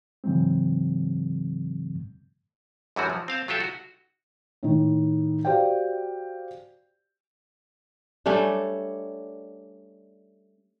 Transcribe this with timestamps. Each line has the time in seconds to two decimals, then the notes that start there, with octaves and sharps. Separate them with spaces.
0.24 G#2 C#3 E3 F#3 G#3 C4
2.96 F#2 D3 E3 F#3 G3 F#4
3.10 F3
3.28 C4 F5 A5
3.48 F#3 F4 G4 A4 E5
3.60 F#4
4.63 A2 D#3
5.45 F#4 G4 C5 D5 F5 G5
8.26 G3 A3 C#4 D4